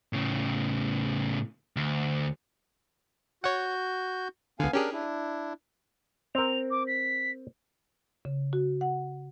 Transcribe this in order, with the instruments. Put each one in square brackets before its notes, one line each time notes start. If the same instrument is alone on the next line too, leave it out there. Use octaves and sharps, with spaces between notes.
[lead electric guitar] A2 C#3
D2
[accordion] F#4 G6 [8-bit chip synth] C#5 F#5
[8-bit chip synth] C#2 D3 [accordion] B3 F5 G#5
[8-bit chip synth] C#4 G4 G#4 [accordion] D4 A#4
[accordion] D4 E4
[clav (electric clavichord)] C4 A#4 [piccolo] F7
[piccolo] D6
B6
[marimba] C#3
F#4
F#5